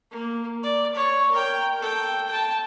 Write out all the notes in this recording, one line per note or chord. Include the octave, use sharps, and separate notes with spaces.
A#3
D5
C#5 C#6
A#4 G5
A4 G5
G5 A5